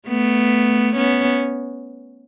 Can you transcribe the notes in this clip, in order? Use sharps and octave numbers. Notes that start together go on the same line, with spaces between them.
A3 B3
B3 C#4